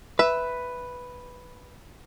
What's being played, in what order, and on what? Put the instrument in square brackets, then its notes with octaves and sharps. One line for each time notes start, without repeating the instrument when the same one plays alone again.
[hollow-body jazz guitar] B4 [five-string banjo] E5